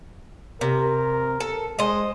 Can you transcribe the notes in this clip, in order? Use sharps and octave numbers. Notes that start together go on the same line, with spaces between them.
C3 A#4
A4
G#3 C5 D#5